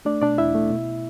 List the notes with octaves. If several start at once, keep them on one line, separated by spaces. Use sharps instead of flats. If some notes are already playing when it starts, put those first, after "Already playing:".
A3 D4 D5
B2 D4 D5
E2 E4 E5
A3
B2